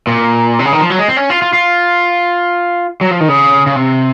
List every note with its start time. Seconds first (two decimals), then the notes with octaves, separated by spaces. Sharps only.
0.07 A#2
0.59 C3
0.65 C#3
0.73 D#3
0.81 F3
0.90 F#3
0.98 G#3
1.08 C4
1.16 C#4
1.30 F4
1.42 F4
1.53 F4
3.01 F#3
3.11 F3
3.20 D#3
3.28 C#3
3.66 C#3
3.76 C3